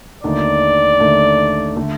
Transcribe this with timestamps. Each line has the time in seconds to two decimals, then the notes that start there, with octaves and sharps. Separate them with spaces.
0.23 D#2 D3 A3 D#4 D5
1.00 D#2 D3 A3 D#4
1.77 D3 A3